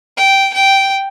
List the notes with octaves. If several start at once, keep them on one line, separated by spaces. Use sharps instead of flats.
G5
G5